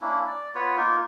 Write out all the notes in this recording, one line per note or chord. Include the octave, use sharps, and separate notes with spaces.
A#3 C#4 D4 E4
D5
B3 F4 B4 C#5
A#3 D#4 F4 A#4